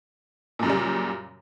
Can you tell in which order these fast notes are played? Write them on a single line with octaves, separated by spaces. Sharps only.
A#2 F#2 C#3 G3